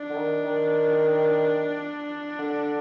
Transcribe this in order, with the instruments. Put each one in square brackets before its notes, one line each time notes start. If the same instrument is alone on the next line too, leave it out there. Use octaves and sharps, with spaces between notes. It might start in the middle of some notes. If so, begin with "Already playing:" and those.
Already playing: [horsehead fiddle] D4
[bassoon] D3
D#3
D#3
D3